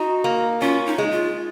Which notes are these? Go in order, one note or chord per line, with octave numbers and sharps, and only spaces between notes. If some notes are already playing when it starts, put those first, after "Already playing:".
Already playing: D#4 F#4
A#3
C#4 F4
D#4
G#3
F4